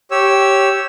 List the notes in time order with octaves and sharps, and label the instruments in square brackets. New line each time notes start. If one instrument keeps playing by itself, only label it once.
[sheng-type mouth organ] G4 C#5 E6